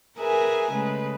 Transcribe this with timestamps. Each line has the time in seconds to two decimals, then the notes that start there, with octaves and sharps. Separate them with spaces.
0.18 G#4 A#4 B4 E5 G#5 A#5
0.72 C#3 G#3 A3 B4